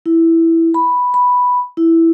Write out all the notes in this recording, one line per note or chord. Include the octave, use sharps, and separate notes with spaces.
E4
B5
B5
E4